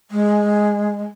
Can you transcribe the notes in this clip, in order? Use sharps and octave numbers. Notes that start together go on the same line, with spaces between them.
G#3